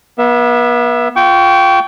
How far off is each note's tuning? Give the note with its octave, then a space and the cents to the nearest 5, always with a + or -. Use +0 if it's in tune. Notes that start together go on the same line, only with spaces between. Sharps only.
B3 -35 E5 +10
F4 +0 G5 -15 C#6 +30